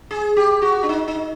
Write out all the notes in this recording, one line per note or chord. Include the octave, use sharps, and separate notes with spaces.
G#4
G4
F#4
D4
D#4
D#4